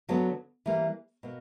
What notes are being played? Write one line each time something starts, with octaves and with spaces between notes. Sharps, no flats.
D3 F#3 B3
E3 G3 A#3
B2 A#3